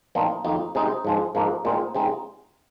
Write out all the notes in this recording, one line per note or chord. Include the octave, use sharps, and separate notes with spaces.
A#2 F3 C4 D#4
F2 D#3 A#3 D#4
C3 G#3 C4 D#4
G#2 F3 G#3
G#2 F3 A#3 D#4
A#2 G#3 C4 D#4
C3 G#3 C4 D#4